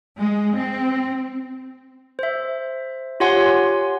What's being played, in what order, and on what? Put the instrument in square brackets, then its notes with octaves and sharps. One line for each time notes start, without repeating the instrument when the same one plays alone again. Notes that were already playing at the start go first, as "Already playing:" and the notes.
[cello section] G#3
C4
[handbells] C5 E5
F4 G4 C#5 F#5 G#5 C6